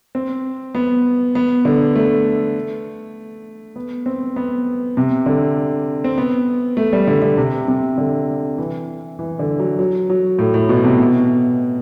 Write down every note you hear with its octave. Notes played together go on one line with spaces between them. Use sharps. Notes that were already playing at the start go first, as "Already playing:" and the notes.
C4
B3
B3
D3
A3
B3
C4
B3
C3
D3
C4
B3
A3
G3
D3
D3
C3
C3
D3
E3
E3
D3
F#3
F#3
F#3
A2
A2
B2
C3
B2